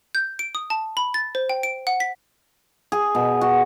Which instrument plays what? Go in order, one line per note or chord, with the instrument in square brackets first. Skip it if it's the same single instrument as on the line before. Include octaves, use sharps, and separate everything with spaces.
[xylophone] G6
D7
D#6
A5
B5
A6
C5
G5
D7
F#5
B6
[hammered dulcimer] G#4
B2
F#4